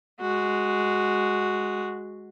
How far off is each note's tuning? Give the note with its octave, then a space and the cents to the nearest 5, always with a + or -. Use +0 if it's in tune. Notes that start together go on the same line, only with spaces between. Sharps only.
G#3 +0 F#4 +0